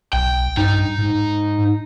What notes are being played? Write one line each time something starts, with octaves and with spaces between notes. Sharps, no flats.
B1 G5
G2 D#4
G#2